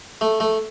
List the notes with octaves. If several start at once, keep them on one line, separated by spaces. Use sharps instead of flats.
A3
A3